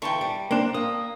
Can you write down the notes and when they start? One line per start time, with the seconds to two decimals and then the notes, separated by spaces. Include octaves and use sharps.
0.02 D3 E3 G5 A5 C#6
0.21 G3
0.51 A#3 C4 D4
0.74 A#3 D#6